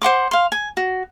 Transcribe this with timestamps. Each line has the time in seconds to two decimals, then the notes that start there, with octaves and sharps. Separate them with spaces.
0.02 C5 F#5 C6 D6
0.31 F5 C6
0.52 G#5
0.77 F#4